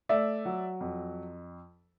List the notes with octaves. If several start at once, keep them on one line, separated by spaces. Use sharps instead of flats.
A3 D5 E5
F#3
F2